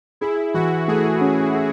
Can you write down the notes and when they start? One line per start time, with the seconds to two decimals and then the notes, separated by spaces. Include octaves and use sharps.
0.21 E4 G#4
0.54 E3 F#4
0.88 A3 G#4
1.21 C#4
1.54 G#4